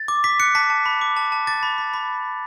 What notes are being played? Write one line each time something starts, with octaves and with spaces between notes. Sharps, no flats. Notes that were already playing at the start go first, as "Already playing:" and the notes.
Already playing: A6
D6
D6 B6
F#6 C#7
A5 B6
A5
B5
D6
A5
A5
D6 A6
B5
B5
B5